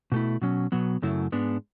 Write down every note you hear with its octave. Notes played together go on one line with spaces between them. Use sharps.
B2 A3 E4
B2 F#3 C#4
B2 F#3 B3
F#2 C#3 F#3 A3 E4
G#2 G#3 B3 D4